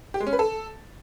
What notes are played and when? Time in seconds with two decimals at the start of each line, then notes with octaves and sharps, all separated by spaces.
0.14 G4
0.20 G#3
0.27 C#4
0.33 B4
0.39 A4